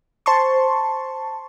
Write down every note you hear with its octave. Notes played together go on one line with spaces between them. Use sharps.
C5 A5 C6 C#6